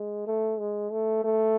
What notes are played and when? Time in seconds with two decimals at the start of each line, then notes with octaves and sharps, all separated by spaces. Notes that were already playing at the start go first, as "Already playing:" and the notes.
Already playing: G#3
0.26 A3
0.59 G#3
0.92 A3
1.24 A3